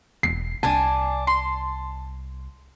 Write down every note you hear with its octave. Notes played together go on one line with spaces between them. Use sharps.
E1 C7
C2 D4 G#5 A5
C6